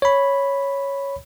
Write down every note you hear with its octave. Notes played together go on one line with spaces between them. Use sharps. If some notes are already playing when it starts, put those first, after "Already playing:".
C#5 B5